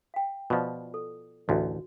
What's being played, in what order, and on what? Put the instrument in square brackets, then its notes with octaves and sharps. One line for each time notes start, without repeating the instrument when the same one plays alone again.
[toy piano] F5 G5
[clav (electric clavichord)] B2 F3 [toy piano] F4 D5
[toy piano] A4
[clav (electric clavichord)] A1 D2 [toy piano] F#4